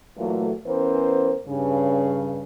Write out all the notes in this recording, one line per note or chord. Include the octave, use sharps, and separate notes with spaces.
A#2 E3 F#3 A3
E3 B3 C#4 A#4 C5
G2 C#3